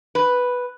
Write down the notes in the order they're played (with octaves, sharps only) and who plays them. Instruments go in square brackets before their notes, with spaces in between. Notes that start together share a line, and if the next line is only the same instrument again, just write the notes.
[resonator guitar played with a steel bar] B4